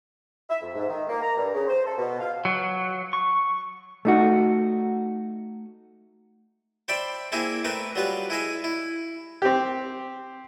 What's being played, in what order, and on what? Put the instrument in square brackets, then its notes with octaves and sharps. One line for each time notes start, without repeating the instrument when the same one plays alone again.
[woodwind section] E5
F2
G#2
D#3
A#3
A#5
G2
C#3
C5
A4
B2
F5
[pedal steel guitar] F#3
C#6
[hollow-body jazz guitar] A3 D#4 F#4
[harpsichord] C5 D5 E5 G5 B5 C6
A#3 C4 E4 G#4 E5
A3 C4 A#4 B4 E5
F#3 G3 F4 B4
E4 G#4 D#5 E5
E4
[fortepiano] C4 G4